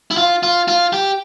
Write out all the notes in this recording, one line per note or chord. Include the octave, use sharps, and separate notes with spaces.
E4
F4
F4
F4
G4